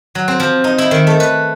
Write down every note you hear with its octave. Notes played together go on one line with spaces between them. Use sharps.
F#3
C4
F3
D#4
E4
D#3
A3
B4